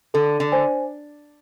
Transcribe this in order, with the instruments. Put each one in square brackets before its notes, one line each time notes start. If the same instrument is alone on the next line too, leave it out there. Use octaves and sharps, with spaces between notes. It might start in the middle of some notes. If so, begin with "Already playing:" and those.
[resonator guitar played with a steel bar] D3 [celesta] A4
[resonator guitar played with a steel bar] D3
[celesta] C5 G#5